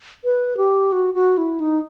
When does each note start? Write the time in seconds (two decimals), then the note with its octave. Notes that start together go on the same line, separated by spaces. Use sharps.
0.24 B4
0.57 G4
0.92 F#4
1.14 F#4
1.37 E4
1.60 D#4